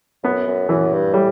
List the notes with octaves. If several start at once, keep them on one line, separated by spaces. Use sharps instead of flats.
F#2 B3
F#2
F#2 E3
G2
A2 G3